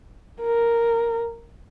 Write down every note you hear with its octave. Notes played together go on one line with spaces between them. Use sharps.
A#4